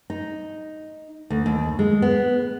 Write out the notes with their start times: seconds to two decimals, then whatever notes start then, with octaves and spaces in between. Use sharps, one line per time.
0.10 D#4
1.30 D2
1.46 D#2
1.79 G#3
2.02 B3